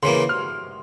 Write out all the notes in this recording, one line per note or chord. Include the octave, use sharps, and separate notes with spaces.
C#3 E3 A#3 C6
F6